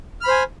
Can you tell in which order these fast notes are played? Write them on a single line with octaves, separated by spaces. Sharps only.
F6 B5 C5 G#5